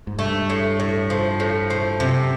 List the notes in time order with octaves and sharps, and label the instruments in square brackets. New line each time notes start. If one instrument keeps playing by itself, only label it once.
[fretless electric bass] G#2
[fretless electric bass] G2 [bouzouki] A3
[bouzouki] A2
A2
F3
A2
F3
[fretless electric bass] F#2 [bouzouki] C3